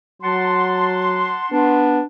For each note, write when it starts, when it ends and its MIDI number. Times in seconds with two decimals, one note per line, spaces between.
0.22 1.36 54
0.22 1.83 78
0.22 1.83 81
0.22 1.83 84
1.52 2.00 59
1.52 2.04 62